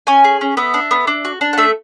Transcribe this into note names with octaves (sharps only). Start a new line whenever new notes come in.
C#4 G#5
G#4
C#4
B3 E5
D4
B3
D4
F#4
D4
F#5
A3 E5